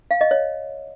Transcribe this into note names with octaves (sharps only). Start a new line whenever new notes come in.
F5
D#5
C#5